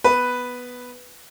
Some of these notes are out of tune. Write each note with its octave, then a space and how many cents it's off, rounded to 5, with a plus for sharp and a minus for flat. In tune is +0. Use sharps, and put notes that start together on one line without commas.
B3 +0 B4 +0